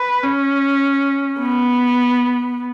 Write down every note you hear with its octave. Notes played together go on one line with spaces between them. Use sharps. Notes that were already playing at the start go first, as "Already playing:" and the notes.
Already playing: B4
C#4
B3